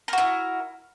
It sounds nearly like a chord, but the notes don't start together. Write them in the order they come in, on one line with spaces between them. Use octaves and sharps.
A#4 F#4 E4